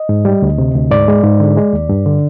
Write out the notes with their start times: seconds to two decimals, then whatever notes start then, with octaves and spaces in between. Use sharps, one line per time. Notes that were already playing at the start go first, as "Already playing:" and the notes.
Already playing: D#5
0.09 G#2
0.25 G3
0.42 D2
0.58 C3
0.75 D2
0.91 G#2 D5
1.08 G#3
1.24 G#2
1.40 D3
1.57 G#3
1.73 D#2
1.89 G2
2.06 D3